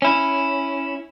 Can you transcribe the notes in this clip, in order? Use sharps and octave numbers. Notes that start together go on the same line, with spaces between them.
C#4 E4